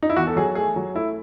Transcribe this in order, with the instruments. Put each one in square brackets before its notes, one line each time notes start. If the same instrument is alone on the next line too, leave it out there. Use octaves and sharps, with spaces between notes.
[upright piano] D#4
E4
E2 F#4
A4
F#3 G#4
A3 G#4
F#3
A3 E4